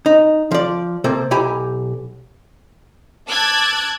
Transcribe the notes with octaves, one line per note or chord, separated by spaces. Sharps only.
D#4
F3 D5
C3 A#3 C4 A4
B1 E4 G4 G#5 A#5
A5 D6 E6 F#6 G#6 A6